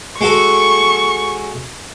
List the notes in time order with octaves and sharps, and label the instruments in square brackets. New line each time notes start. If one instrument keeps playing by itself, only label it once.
[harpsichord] G#3 F#4 A4 [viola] C#6